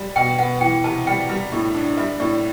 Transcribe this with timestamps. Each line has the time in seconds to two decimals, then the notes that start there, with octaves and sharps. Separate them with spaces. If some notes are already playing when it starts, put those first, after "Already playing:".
Already playing: G3
0.16 B2 G5
0.38 B3 F#5
0.61 E3 G5
0.84 C3 A5
1.07 G3 G5
1.29 G3
1.52 A2
1.74 D4
1.97 G3 E5
2.20 A2 D5